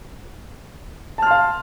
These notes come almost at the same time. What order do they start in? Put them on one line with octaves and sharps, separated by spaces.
A5 F6 C6 F5